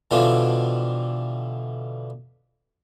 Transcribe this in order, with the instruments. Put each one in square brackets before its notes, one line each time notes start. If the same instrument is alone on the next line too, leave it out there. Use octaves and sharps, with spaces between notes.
[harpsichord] B2 D3 E3 F3 G3 F4